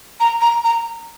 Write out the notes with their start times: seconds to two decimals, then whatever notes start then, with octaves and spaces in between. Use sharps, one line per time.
0.20 A#5
0.41 A#5
0.64 A#5